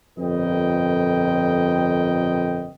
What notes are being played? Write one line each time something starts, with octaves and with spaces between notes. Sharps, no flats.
G1 F2 A#2 B4 D#5 G5